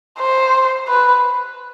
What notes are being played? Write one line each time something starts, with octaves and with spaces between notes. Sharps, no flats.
C5
B4